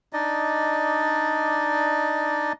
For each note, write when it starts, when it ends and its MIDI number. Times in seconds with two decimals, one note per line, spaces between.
0.13 2.53 62
0.13 2.53 63
0.13 2.53 74
0.13 2.53 75